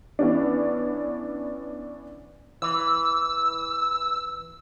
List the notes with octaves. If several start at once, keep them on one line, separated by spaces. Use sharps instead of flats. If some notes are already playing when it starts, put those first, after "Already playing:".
E3 B3 C#4 D4
E3 E6